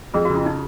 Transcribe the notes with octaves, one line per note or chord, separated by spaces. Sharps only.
F2 G#4
F#4
C#3
F4
D#4